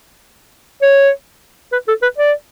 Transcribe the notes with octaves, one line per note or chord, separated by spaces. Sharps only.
C#5
B4
A4
B4
D5